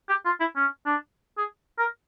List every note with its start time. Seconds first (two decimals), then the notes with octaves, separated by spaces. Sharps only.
0.09 G4
0.25 F4
0.40 E4
0.56 C#4
0.86 D4
1.37 G#4
1.79 A#4